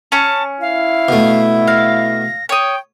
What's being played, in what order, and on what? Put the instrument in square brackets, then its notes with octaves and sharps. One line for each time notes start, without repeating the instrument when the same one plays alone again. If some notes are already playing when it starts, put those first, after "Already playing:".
[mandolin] C#4 C#6 [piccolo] A5
[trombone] E4 [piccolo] F5
[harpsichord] B2 A3
[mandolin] F5 [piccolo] A#6
[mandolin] C#5 D#6 [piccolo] G5